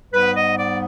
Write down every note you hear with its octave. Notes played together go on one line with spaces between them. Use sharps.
G#2 G3 B3 B4
D#5
D5